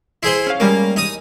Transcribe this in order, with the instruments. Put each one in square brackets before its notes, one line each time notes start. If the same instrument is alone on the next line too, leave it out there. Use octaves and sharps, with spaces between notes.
[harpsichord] E4 G#4 C5 [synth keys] C6
[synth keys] C#4 F5
[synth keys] G3 G#3 C#4 [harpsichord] A#3
[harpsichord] D#4 D#6